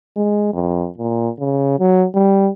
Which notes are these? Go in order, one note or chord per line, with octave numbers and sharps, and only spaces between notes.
G#3
F2
A#2
C#3
F#3
G3